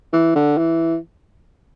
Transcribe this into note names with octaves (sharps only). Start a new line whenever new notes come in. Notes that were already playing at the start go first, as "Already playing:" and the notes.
E3
D3
E3